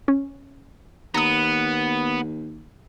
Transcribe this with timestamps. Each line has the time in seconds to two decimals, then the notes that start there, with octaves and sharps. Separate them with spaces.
0.08 C#4
1.14 D#2 B3 A#5 D#6